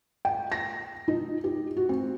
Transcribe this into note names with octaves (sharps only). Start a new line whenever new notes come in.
G5
A#6
D#4
G4
F#4
C4